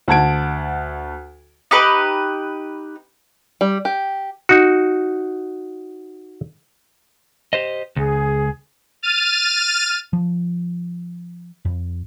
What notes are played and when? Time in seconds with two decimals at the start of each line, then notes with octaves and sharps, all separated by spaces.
0.08 D2 F#5 A5 G#6 D7
1.71 D#4 G4 B4
3.61 G3
3.85 G4
4.49 D#4 F#4
7.53 G4 C5 D#5
7.96 C#2 G#4
9.03 F6 A6 D#7
10.13 F3
11.65 F2